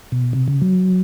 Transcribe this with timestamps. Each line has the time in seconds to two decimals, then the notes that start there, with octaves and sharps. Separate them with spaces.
0.12 B2
0.33 C3
0.48 C#3
0.62 F#3